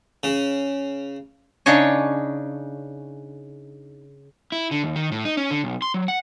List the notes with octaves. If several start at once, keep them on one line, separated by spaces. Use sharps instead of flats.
C#3
C#3 D4 D#4 C#5 D#5
E4
D3
D#2
D#3
A2
D#4
C#4
D3
B1
C6
F#3
F#5